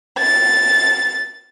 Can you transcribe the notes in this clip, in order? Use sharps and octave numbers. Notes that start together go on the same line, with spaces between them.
A6